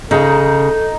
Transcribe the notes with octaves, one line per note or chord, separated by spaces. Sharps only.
C#3 D#4 A4 A#5